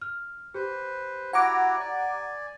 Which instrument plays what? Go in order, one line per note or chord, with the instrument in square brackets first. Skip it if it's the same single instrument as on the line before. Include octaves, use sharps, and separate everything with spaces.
[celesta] F6
[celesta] G4 [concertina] B4 C5
[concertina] E4 F#4 C#5 [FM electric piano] F#5 A#5 D6
[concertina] D5 G#5